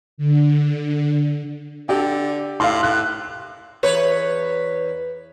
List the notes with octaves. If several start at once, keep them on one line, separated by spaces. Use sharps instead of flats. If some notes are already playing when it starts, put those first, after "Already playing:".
D3
D3 D4 G4
A2 F5 C6
A2 F#6
E2 B4 C#5